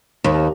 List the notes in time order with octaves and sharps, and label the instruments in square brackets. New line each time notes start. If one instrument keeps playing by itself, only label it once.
[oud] D#2